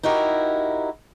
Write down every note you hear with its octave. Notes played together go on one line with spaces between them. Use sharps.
D#4 E4 F#4 G4 A#4